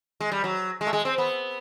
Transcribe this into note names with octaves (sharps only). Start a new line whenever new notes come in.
G#3
G3
F#3
G#3
A3
G#3
C4
B3